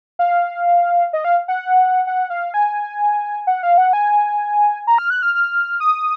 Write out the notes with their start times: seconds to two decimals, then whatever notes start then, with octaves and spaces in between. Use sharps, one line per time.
0.19 F5
1.13 D#5
1.25 F5
1.48 F#5
2.07 F#5
2.30 F5
2.54 G#5
3.47 F#5
3.63 F5
3.78 F#5
3.93 G#5
4.87 A#5
4.98 F6
5.10 F#6
5.22 F6
5.35 F6
5.80 D#6